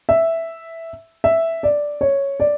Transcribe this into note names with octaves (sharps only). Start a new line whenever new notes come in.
E5
E5
D5
C#5
D5